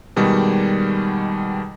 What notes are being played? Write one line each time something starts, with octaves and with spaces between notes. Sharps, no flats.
B2 D#3 G3 G#3 F#4